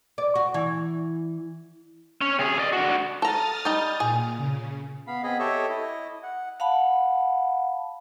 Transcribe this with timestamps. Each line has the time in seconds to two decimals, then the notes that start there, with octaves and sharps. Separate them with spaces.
0.18 D5
0.35 F#4
0.54 E3
2.21 C#4
2.39 C3 G#4
2.59 D5 D#5
2.73 D4 F#4
3.22 A4 A#5 D#6 F6 A6
3.65 G3 D#4
4.00 A#2 G#4
4.37 C#3
5.07 B3 F5 B5
5.23 B3 C4 G#4 D#5 B5
5.39 G4 A4 C#5 D#5 E5
5.69 E4 D#5
6.23 F#5
6.60 F5 F#5 A5 B5